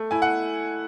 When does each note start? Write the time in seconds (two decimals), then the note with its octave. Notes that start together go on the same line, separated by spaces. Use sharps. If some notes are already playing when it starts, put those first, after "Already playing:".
Already playing: A3
0.11 E4 G#5
0.22 F#5